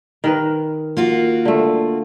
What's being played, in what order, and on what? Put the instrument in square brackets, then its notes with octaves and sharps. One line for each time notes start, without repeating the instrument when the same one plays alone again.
[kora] D#3 A#4 B4
[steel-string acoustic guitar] A#3 F4 F#4
[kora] D3 A3